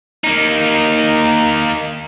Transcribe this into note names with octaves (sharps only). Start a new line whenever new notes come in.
A#3 D#4